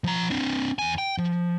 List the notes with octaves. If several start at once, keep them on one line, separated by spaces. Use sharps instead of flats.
F3 A#5
C4 D4
E2 G#5
G5
F3